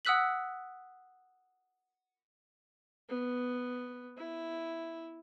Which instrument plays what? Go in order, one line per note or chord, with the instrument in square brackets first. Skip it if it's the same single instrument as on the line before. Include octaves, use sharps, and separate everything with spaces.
[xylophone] F#5 D#6 E6 F#6 B6 F#7
[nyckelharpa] B3
E4